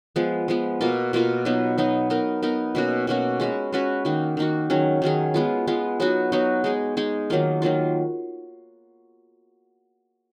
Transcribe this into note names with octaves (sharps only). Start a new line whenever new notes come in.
F3 G#3 B3
F3 G#3 B3
B2 A#3 F4 A#4
B2 A#3 F4 A#4
F#3 B3 D#4
F#3 B3 D#4
B3 D#4 A#4
B3 D#4 A#4
B2 A#3 C#4 F#4
B2 A#3 C#4 F#4
G#3 C#4 F#4 B4
G#3 C#4 F#4 B4
D#3 A#3 D#4 F#4
D#3 A#3 D#4 F#4
D#3 F#3 C#4 G#4
D#3 F#3 C#4 G#4
G#3 B3 F4
G#3 B3 F4
F#3 B3 D#4 F#4
F#3 B3 D#4 F#4
G#3 D#4 G#4
G#3 D#4 G#4
D#3 F#3 A#3 F4
D#3 F#3 A#3 F4